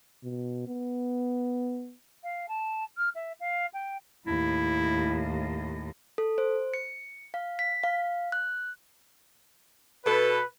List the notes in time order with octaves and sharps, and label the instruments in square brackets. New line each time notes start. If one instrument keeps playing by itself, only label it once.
[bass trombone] B2
B3
[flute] F5
A5
F6
E5
F5
G5
[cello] D#2 A2 [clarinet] E4
[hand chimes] A4
C5
C#7
F5
B6
F5
F#6
[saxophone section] B2 A4 [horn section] B4